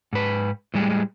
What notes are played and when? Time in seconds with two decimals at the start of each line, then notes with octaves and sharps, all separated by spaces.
0.13 G#2 B4
0.74 A2 G3 G#3